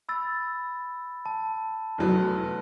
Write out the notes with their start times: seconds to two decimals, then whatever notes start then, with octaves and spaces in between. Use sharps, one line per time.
0.09 B5 E6 A6
1.26 A5
1.98 F1 F#3 B3